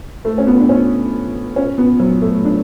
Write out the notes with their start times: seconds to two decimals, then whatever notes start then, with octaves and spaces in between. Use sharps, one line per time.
0.25 A3
0.38 C#4
0.47 B3
0.60 D4
0.69 C#4
1.56 C#4
1.78 B3
1.99 F#3
2.22 A3
2.45 D4